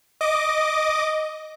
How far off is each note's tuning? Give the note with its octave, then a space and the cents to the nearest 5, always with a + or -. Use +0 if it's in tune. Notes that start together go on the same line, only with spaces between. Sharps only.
D#5 +0 D6 +0